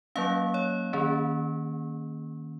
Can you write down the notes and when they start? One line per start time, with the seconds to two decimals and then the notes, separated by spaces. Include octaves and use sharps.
0.15 F#3 A#3 C#4 F5
0.54 C#5
0.93 D#3 A#3 C#4